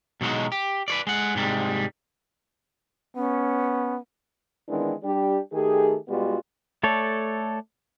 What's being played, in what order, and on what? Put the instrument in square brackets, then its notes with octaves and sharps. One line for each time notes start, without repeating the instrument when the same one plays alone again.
[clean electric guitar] B2 F#3 G#3 D#4 F#4
G4
B4 C#5 D5
G#3 F#5
G#2 C3 G3 G#3
[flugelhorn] B3 [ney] C#4
[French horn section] D#3 E3 G#3 B3 C4 D4
G3 D4 G4
D#3 A3 G4 G#4
B2 G3 G#3 B3 F4 F#4
[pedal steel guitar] A3 A4 C#5 D5